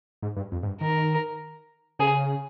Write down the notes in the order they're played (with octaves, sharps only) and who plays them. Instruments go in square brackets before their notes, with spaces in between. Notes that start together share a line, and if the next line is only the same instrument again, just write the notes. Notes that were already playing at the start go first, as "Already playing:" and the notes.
[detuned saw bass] G#2
G2
F2
G#2
G2
[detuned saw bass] D#3 [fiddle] A#4
[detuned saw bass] C#3 [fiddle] G#4